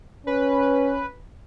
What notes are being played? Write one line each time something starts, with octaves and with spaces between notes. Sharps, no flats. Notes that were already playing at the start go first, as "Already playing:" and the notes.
C#4 B4